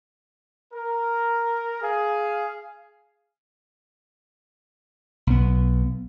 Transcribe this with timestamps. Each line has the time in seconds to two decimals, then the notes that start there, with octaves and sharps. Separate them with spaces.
0.73 A#4
1.82 G#4 F5
5.27 B1 B3